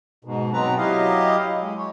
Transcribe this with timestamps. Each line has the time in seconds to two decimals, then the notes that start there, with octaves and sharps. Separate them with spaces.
0.25 G#2 B2
0.53 B2 F#3 B3 C4 B4 A#5
0.78 F#3 E4 G4 D#5 F5
1.61 G#3
1.77 C#5